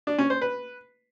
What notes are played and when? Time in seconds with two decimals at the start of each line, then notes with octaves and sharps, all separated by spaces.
0.07 D4
0.18 C#4
0.30 C5
0.42 B4